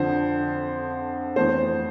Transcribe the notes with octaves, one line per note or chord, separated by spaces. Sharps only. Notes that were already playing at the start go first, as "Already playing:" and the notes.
Already playing: F2 D3 F3 C5
F2 E3 A3 C5